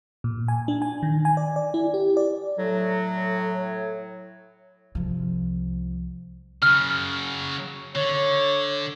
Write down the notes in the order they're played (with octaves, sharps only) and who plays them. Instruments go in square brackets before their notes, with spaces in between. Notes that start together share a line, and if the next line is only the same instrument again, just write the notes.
[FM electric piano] A#2
G#5
D4
G#5
D#3
G#5
D5
D5
E4
G4
D5
[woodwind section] A2 F#3
[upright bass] C2 F3
[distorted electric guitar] C#3 F#3 [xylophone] F6
[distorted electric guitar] D3 [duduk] C#5